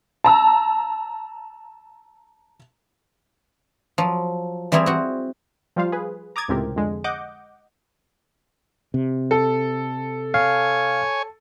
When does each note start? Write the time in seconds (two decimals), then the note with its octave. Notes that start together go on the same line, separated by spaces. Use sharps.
0.24 A5 A#5 E6
3.98 F3 F#3
4.72 E3 G3 C4 E4 G#4 A#5
4.86 C4 F#4
5.76 F3 G3 F4 C5 F5
5.92 G#4 B4
6.36 A#5 D6 D#6 G#6 A6
6.48 C#2 A2 C3 C4 G4 A#4
6.76 F2 D3 G#3
7.04 D#5 F#5 D6 G6
8.94 C3
9.31 A4
10.34 C#5 F5 G#5